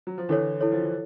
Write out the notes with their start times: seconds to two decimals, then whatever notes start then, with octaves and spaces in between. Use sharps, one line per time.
0.07 F#3
0.18 F3
0.29 D3 E3 E4 A4 C#5
0.61 E4 A4 C#5
0.72 F3
0.82 E3